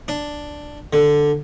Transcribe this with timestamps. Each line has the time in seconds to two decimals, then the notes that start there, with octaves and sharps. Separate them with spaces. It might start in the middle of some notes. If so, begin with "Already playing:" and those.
0.08 D4
0.93 D3